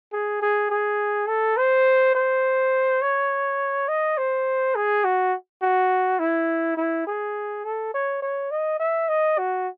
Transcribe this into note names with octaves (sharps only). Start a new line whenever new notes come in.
G#4
G#4
G#4
A4
C5
C5
C#5
D#5
C5
G#4
F#4
F#4
E4
E4
G#4
A4
C#5
C#5
D#5
E5
D#5
F#4